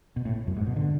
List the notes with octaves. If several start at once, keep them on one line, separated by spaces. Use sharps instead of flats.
B2
A2
F#2
G#2
B2
D3